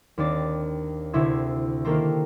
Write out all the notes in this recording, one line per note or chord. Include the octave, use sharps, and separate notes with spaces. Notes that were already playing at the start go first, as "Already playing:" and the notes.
D#2 C4 D4 D5 A6
D2 C3 E4 C6 E6 G#6
D#3 A#3 G4 A4 A#4 C5